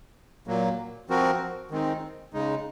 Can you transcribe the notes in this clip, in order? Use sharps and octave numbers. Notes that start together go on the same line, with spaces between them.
A#2 F#3 A#3
F3 C4 F#4 A#4
D#3 G#3 C4 D#4
C#3 G#3 D#4